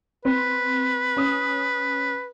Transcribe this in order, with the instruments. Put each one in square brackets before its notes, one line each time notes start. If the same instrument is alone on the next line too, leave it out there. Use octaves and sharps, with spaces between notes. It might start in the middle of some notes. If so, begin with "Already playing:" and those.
[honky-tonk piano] C4 [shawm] B4
[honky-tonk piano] C#4 D#6